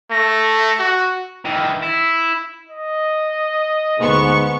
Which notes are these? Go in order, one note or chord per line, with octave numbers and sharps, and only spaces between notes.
A3 A#6
F#4
D#3 E3
E4
D#5
D2 G#2 B3 C#6